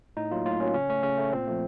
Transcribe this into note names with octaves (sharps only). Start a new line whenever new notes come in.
A2 D#4
F#3 A#3 F4
A2 F4
F#3 A#3 C#4
C#3 C#4
A3 C#4
C#3 C#4
A3
A#2 C4
F3 A3